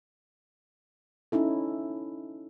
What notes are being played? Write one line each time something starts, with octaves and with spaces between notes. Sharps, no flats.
C#4 D#4 E4 A4